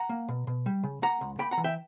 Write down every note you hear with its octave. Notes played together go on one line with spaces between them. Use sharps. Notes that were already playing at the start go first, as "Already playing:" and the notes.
Already playing: F#5 A#5
A#3
B2
B2
G3
C#3
A#3 F#5 A#5
C#2
A#3 G5 B5
F#5 A#5
E3
E5 G5